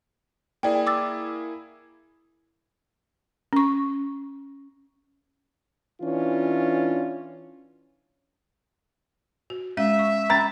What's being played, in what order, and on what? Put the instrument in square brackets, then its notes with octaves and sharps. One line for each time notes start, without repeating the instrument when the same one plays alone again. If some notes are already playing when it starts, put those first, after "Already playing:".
[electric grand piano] A#3 E4 G#4 [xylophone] D5 G5
[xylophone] D6 E6 A6
[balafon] C#4 C#6
[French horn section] E3 C#4 D4 F4
[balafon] F#4
[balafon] G#3 C#4 F5 [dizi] E5
[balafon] C#6
[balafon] C#4 G5 B5 [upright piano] A#5 A6